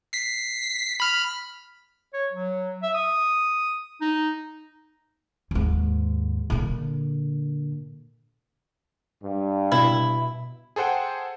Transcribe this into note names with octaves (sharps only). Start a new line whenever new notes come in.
B6 C7
B5 F6
C#5
F#3
E5
D#6
D#4
D#2 G#2
A#2 D3
G2
B2 E4
G#4 A4 C5 F#5 G5